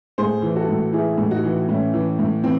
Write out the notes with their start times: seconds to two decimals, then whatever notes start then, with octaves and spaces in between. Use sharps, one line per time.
0.18 A2 G#4 C5
0.42 E3
0.56 F#4 A4
0.69 A2
0.93 E3 E4 G#4
1.18 A2
1.31 D#4 F#4
1.44 E3
1.69 A2 C#4 E4
1.94 E3
2.19 A2
2.44 E3 C4